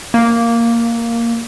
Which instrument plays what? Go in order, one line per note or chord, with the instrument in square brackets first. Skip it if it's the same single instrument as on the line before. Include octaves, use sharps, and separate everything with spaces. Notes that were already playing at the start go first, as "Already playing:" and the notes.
[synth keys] A#3